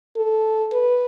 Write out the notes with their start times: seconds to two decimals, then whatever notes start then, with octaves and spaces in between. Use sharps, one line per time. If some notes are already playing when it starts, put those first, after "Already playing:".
0.17 A4
0.73 B4